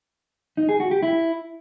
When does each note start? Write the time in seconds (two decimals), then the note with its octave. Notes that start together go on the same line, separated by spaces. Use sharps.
0.57 D#4
0.69 G#4
0.80 F#4
0.91 G4
1.02 E4